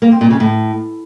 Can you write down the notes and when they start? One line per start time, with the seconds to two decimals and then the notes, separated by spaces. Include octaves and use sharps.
0.02 A#3
0.11 C4
0.21 A#2
0.30 C#3
0.40 A2